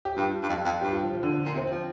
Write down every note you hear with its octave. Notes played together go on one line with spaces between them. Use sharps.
G4
G2 F4
G2
F2
F2
G2 G4
F4
F3
F3
D3
F3
A#2
C3
C4
F3 C4